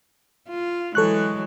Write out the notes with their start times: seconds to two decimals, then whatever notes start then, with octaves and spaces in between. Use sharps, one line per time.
0.49 F4
0.95 E3 F#3 G#3 A4 C#6 F#6